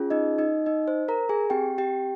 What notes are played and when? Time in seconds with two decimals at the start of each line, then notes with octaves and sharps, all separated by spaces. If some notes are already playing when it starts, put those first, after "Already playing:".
Already playing: C#4 F4 G#4
0.10 D#4 D#5
0.38 D#4 D#5
0.66 D#4 D#5
0.88 C5
1.08 A#4 A#5
1.29 G#4 G#5
1.50 C4 G4 G5
1.78 G4 G5